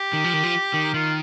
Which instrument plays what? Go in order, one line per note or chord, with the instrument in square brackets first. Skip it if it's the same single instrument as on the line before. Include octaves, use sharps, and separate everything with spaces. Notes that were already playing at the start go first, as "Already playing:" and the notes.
Already playing: [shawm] G4
[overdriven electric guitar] D#3
F3
D#3
F3
D#3
[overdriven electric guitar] D#3 [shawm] F4